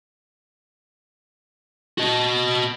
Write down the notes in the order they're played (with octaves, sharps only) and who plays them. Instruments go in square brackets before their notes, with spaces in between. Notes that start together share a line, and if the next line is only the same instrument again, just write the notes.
[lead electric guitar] F#4 D#5